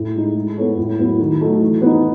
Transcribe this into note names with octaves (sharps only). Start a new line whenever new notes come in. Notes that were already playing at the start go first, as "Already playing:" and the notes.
Already playing: A2
G#3 D#4
G#3
B3 E4 A4 C#5
A2
F#3 B3 E4 B4
D#3
F#3 A3 D#4 F#4
E3
B3 D#4